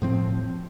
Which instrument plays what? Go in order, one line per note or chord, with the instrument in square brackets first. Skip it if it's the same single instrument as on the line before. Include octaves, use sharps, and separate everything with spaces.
[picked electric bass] A2 F3 C4